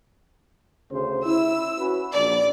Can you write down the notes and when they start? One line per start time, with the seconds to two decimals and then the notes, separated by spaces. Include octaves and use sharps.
0.89 D2 C#3 C5
1.24 E4 E6
1.78 C#4 F#4 B4
2.14 A#1 D5